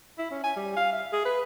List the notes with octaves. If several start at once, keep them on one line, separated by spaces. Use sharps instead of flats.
E4
C#4
G#5
G3
F5
E5
G#4
B4